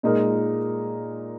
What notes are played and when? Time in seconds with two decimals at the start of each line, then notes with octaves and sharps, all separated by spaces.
0.03 A#2 G#3 D#4 A#4